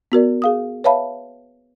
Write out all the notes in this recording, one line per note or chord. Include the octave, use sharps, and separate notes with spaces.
B3 F#4 A#4 D5
G#4 F5 D#6
B4 C#5 E5 F5 A5 B5